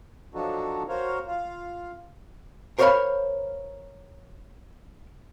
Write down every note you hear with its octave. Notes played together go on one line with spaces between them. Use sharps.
F3 F#3 D4 D#4 F#4 A4
F#4 A#4 C5 C#5 F5
F4 F5
A#4 C5 C#5 E5 F5 B5